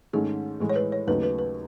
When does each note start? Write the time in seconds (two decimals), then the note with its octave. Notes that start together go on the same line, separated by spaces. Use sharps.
0.13 G#2 D#3 A3 C#4 G#4
0.60 A2 E3 G#3
0.70 C#5
0.76 B4
0.92 C#5
1.07 D#2 C#3 F#3 A3 D#4 B4
1.23 B4
1.39 B4